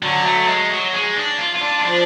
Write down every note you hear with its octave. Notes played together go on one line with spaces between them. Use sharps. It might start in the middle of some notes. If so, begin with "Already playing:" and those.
D3 F#3
A3
G#3
F#3
G#3
D4
F4
F4
D4
F4
F3 D4